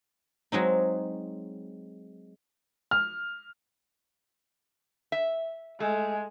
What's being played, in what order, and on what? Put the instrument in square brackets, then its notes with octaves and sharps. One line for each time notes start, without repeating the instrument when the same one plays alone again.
[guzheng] F#3 G#3 C4 D#4
[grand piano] F6
[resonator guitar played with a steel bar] E5
[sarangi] G#3 [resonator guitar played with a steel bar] A3